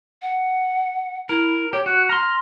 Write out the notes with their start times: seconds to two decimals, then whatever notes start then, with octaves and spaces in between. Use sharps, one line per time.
0.22 F#5
1.29 E4 A#4
1.73 G4 C#5
1.86 F#4 F#6
2.09 A#5 C6 F6